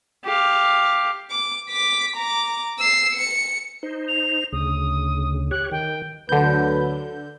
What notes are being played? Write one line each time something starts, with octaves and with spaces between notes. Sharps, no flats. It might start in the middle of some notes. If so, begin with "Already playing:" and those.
G4 F5
D6
D6 B6
A#5 D6
E6 C7
C#7
D#4 C5
F7
D2 C#3 D#6
G4 C#5 F#6
D#3 G5
D2 D3 F#3 B4 G6